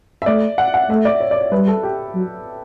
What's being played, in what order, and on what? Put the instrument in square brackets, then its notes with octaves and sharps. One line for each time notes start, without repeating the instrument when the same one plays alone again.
[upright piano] E5
[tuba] A3 [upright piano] D5
[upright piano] F#5
F#5
[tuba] A3 [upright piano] E5
[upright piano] D5
C#5
D5
C#5
[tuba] G3 [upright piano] B4
[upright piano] A4
G4
[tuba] F#3